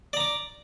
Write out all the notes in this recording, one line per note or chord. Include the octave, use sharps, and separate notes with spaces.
D5 A#5 D6